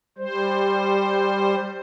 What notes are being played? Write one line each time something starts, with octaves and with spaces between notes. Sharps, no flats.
G3 C5